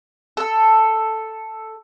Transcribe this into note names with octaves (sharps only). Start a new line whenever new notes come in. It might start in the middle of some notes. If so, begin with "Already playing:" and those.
A4 E6